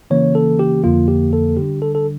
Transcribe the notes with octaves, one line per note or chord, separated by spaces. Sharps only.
C#3 E3 A#3 C#4 C#5
A4
G4
F2 D3 F3 A#3 F4
G4
A4
D3 G3 D4 G4
A4
A4